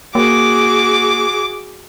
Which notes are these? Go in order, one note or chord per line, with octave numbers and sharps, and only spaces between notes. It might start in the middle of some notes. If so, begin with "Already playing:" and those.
A#3 F#4 G#4 D6